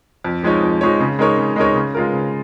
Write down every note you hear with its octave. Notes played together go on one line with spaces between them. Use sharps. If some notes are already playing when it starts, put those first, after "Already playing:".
F2
F3 G#3 D#4 C#5
F2
F3 G#3 D#4 C#5
C#3
G#3 D#4 A#4 C#5
C#3
G#3 D#4 A#4 C#5
C#3
G#3 F4 A#4
C#3